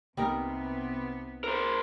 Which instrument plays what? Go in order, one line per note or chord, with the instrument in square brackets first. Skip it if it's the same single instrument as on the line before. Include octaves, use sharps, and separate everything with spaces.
[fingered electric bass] C2 A#3 [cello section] C3 B3 [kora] G3 D#4 A#4
[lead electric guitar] A#4 C5